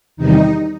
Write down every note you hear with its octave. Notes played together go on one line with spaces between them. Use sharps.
E2 C3 D#3 G3 D#4